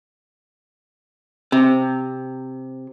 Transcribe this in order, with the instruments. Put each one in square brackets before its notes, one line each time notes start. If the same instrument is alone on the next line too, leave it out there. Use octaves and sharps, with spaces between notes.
[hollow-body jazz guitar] C3